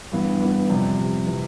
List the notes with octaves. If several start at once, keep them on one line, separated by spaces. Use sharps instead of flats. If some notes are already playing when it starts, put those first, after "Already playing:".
G2 E3 B3
G2 E3 B3
F2 C3 G3
F2 C3 G3
C3 E3